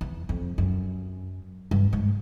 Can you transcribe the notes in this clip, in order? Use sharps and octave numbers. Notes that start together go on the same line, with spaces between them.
E2
F2
F#2
G2
G#2